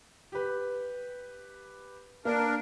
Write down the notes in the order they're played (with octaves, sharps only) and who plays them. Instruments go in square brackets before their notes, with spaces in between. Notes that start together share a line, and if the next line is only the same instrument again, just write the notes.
[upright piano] G4 B4
[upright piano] A#3 [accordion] D4 A#4